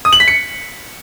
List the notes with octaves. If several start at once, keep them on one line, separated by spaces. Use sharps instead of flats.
D#6
F#7
B6
C#7